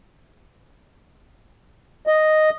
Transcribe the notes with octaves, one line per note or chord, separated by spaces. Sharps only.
D#5